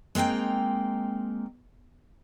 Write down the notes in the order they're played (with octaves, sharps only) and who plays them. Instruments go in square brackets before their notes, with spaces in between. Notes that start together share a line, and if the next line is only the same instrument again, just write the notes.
[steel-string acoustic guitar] G#3 A#3 C4 D#4 G5